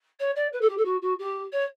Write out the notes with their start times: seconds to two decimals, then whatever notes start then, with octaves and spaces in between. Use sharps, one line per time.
0.19 C#5
0.35 D5
0.52 B4
0.61 A4
0.69 G4
0.77 A4
0.85 F#4
1.02 F#4
1.19 G4
1.52 C#5